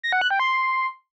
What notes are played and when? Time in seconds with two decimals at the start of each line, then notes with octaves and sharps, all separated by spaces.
0.03 A#6
0.12 F#5
0.21 F#6
0.31 G5
0.40 C6